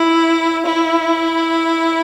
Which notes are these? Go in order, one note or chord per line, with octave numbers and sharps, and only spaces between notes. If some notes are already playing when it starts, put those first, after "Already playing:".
Already playing: E4
E4